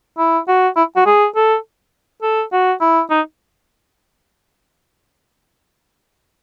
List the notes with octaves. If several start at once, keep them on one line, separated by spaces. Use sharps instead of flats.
E4
F#4
E4
F#4
G#4
A4
A4
F#4
E4
D#4